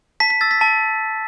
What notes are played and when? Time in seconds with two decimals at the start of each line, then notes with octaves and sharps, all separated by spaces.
0.20 A5 B6
0.30 B6
0.41 E6 A6
0.51 B6
0.61 A5